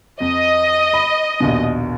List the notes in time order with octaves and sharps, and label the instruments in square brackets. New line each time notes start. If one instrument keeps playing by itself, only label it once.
[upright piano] F2 [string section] D#5
[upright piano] B5
A#1 D#2 B2